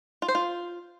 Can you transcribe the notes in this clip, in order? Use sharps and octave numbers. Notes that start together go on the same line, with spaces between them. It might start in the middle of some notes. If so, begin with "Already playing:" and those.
F4
C5
F4